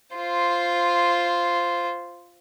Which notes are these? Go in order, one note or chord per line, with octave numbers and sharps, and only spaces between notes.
F4 C5